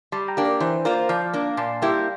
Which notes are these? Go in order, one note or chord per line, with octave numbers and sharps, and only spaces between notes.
G3 A5 C6
G5 A#5
A#3 D4 G4
A#4 D5
E3 C5
A#3 F4 A#4 C5 D5
F3 D5 F5
A#3 D4
A#2 A5 C6
G3 A#3 E4 G4